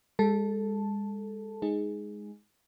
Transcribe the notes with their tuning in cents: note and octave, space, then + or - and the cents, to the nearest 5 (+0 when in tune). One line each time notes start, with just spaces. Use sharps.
G#3 -35 A4 +0 A5 +0
G#3 +0 D#4 +5 G#4 +0